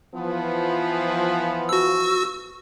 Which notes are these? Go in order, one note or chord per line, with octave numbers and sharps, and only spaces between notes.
E3 F3 B3
F#4 E6